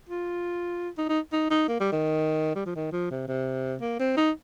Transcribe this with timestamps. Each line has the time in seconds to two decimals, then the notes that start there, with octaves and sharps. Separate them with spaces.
0.09 F4
0.98 D#4
1.09 D#4
1.33 D#4
1.50 D#4
1.68 A#3
1.80 G3
1.92 D#3
2.56 G3
2.66 F3
2.75 D#3
2.92 F3
3.11 C3
3.28 C3
3.81 A#3
3.99 C4
4.17 D#4